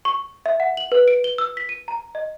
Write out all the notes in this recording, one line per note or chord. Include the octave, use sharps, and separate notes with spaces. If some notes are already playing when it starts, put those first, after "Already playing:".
C#6
E5
F#5
F#7
B4
D7
G7
E6
B6
D#7
A#5
D#5